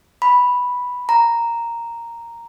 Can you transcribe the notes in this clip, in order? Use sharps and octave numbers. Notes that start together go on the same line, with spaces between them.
B5
A#5